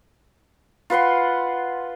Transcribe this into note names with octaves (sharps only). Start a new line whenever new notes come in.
F4 B4 F#5 C6